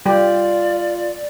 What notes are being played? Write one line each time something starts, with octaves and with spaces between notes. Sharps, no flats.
G3 F4 G4 D5